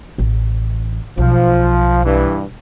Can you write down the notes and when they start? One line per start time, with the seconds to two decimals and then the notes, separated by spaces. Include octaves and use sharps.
0.18 A1
1.17 B1 F3
2.05 G2 E3